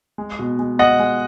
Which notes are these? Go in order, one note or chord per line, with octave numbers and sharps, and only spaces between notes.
G#3
B2
G#3
G#3 D#5 F#5
G#3